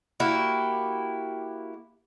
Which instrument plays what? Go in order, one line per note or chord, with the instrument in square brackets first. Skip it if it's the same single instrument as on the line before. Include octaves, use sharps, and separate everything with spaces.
[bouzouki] A#3 E4 F#4 G4